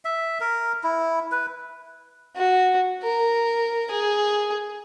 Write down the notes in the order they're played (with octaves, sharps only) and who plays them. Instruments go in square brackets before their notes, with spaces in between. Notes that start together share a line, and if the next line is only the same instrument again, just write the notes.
[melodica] E5
A#4
E4
B4
[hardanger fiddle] F#4
A#4
G#4